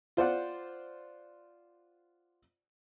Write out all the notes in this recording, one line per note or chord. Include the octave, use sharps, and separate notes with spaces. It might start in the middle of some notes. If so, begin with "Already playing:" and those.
F4 C5 D5 F#5